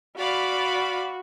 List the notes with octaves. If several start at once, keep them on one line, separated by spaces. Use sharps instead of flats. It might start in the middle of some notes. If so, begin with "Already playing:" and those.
F#4 D5 F5 B5